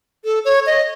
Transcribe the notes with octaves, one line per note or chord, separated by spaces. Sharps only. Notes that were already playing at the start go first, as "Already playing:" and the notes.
A4
C#5
D#5